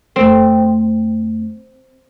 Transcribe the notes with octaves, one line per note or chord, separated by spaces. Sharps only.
F2 A3 C4